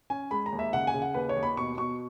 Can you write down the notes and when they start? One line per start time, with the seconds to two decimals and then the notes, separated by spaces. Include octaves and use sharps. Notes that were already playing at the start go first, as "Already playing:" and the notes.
0.10 C#4 G#5
0.31 G#3 B5
0.46 A#5
0.52 D#2
0.59 E5
0.73 C#3 F#5
0.87 G#5
0.94 C#3
1.02 F#5
1.14 D#2 B4
1.29 C#5
1.36 D#2
1.43 B5
1.57 B2 C#6
1.78 B2 C#6